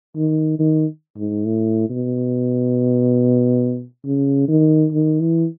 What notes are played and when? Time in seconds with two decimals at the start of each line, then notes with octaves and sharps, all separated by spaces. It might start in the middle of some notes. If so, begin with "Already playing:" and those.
0.16 D#3
0.59 D#3
1.17 G#2
1.46 A2
1.89 B2
4.05 C#3
4.48 D#3
4.92 D#3
5.20 E3